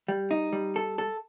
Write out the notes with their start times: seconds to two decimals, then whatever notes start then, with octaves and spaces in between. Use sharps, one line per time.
0.08 G3
0.31 D#4
0.53 G3
0.76 A4
0.98 A4